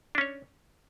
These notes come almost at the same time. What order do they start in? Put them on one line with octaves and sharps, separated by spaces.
D4 C#4 C#5